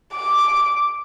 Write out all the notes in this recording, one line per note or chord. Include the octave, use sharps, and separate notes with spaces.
D6